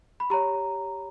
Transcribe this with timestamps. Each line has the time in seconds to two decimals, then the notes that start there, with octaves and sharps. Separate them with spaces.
0.20 B5
0.30 G4 C#5 A#5